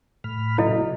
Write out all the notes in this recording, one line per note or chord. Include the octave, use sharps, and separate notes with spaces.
A2 B5 F6
A#2 C#3 F#3 E4 A4 D#5